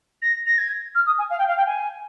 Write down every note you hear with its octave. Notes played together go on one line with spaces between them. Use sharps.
A#6
A#6
G#6
F6
D#6
G#5
F5
G5
F5
G5
G#5